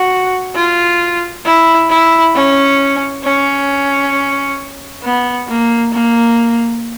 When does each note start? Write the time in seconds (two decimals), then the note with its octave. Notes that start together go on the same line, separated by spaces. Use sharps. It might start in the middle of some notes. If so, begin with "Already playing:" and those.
Already playing: F#4
0.55 F4
1.45 E4
1.90 E4
2.35 C#4
3.24 C#4
5.04 B3
5.48 A#3
5.93 A#3